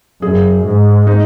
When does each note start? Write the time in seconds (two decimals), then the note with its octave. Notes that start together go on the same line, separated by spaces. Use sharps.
0.22 F#2 G#4
0.65 G#2
1.07 D#4